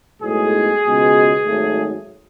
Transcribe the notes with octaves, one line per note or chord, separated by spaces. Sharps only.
B1 A2 G#3 G#4
C#2 B2 G#3
G#1 G#2 F#3 A3